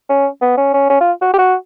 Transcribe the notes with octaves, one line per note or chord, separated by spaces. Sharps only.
C#4
B3
C#4
C#4
C#4
F4
F#4
G4
F#4